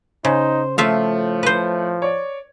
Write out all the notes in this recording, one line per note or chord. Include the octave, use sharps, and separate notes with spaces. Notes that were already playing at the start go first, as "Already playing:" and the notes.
C#3 D#4 C5
A2 F3 A3 F4 E5 F5
B4 C5
C#5 D5